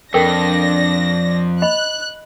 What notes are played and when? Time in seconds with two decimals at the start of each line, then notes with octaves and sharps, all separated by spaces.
0.14 F2 D4 A4 A#4 G5 A#6
1.62 D#5 B5 F#6